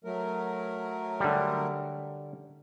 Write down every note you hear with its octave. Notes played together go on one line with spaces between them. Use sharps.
F#3 A3 A#4
D3 G3